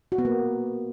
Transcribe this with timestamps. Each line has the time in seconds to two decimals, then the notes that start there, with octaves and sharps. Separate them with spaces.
0.12 F#4
0.18 B3
0.25 A#3